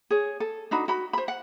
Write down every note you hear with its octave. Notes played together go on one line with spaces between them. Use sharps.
G#4 C#5
A4
D4 D#4 F#4 B5
F#4 B5
C5 B5
F#5